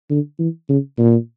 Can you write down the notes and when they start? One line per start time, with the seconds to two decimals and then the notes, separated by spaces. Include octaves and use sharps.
0.10 D3
0.39 E3
0.69 C#3
0.98 A#2